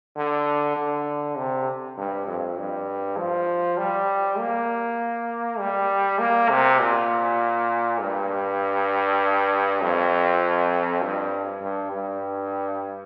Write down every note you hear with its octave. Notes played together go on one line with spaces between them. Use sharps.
D3
D3
C3
G2
F2
G2
F3
G3
A#3
G3
A#3
C3
A#2
G2
F2
G2
G2
G2